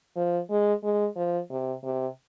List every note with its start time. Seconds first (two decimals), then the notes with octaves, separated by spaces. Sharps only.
0.16 F3
0.50 G#3
0.84 G#3
1.16 F3
1.50 C3
1.84 C3